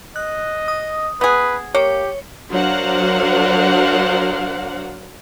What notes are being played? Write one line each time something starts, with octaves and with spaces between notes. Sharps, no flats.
D#5 F#6
D#6
B3 G#4 B4
A#3 G4 C#5
F#3 D4 A#4 C5 F5 F#5